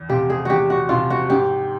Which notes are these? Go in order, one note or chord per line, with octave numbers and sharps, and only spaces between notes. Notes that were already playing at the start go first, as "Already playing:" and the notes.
Already playing: E2
C3 F3 G4
G#4
E2 F#4 G4
F#4
C3 F3 F4
F#4
G#2 G4